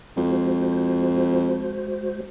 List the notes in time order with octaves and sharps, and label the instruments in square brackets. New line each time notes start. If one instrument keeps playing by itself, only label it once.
[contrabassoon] F2 [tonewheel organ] G#3 F#4 C5